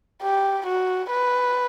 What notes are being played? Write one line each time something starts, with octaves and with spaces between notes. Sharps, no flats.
G4
F#4
B4